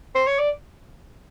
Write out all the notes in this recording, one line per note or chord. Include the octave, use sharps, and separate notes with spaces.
C5
C#5
D5